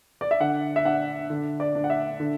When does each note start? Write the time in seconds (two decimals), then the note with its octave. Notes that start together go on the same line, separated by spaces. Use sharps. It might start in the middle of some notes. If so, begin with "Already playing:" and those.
0.21 D5
0.31 E5
0.40 D3 F#5
0.76 E5
0.85 D4 F#5
1.30 D3
1.60 D5
1.75 D4
1.84 F#5
1.90 E5
2.20 D3